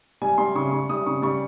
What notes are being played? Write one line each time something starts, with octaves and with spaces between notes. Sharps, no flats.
G3 G#5
G3 C6
C#3 C#6
G3 C#6
G3 D#6
C#3 C#6
G3 C#6